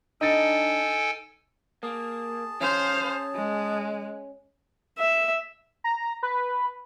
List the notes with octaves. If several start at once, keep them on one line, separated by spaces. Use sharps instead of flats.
D4 D#4 A4 G5 G#5 A6
A#3 G#4 A5
C#4 C5 F5
G#3
E5
A#5
B4